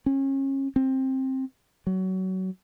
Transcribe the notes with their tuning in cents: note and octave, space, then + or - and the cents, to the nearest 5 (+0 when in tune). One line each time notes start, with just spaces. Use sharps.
C#4 -30
C4 +15
F#3 +25